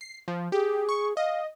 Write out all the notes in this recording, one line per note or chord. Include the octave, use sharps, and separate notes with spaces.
C7
F3
G4 G#4
C#6
D#5 F5